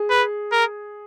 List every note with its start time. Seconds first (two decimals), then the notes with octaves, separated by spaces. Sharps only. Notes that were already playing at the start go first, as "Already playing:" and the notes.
Already playing: G#4
0.11 B4
0.52 A#4